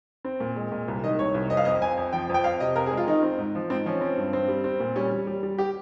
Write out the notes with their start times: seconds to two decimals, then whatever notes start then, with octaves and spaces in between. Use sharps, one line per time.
0.25 C4
0.40 A#2
0.56 G#3
0.72 A#2
0.88 C2
1.03 D#3 D#5
1.19 C2 C#5
1.34 C2
1.50 F2 D#5
1.57 F5
1.65 F2 D#5
1.81 F2 G#5
1.97 F2
2.13 F3 G5
2.29 F2 G5
2.44 F2 F5
2.60 C3 D#5
2.76 F2 A#4
2.86 G#4
2.92 G#3
2.97 F4
3.07 D#3 D#4
3.23 C4
3.38 G#2
3.55 F3
3.70 G#2 C4
3.86 F3 C#4
4.01 C4
4.18 G2
4.33 C4
4.48 G3
4.64 C4
4.80 A#2
4.96 G3 C#4
5.11 G3
5.27 G3
5.43 G3
5.58 G4